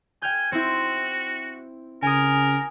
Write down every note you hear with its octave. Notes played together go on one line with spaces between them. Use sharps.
G5 G#5 F6 G6
C4 E4 F#4
C#3 A#4 G#5 D#6